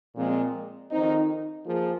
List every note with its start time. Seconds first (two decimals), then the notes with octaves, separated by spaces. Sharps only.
0.15 A#2 F3 G#3 C4 G#4
0.90 F2 D#3 C4 D#4
1.65 F3 A#3 F4 G#4